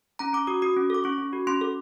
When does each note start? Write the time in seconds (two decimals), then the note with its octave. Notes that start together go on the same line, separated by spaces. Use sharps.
0.19 C#4 A#5
0.33 C#4 D6
0.47 F#4 D#6
0.62 F#4 D#6
0.76 C#4
0.90 A4 D6
1.04 C#4 C#6
1.18 C#4
1.33 F#4
1.47 C#4 C6
1.61 A4